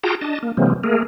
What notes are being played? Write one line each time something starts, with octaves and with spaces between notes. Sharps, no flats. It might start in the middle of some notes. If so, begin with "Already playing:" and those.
F4 F#4 G#4 G5 A5 A#5
D4 D#5 A5
A#3
C3 E3 F#3 G#3 A#3 C4
A3 A#3 G#4 A#4